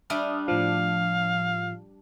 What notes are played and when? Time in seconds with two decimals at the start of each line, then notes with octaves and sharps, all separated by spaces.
0.10 G3 D4 E5 D#6 F6
0.48 A2 F3 F5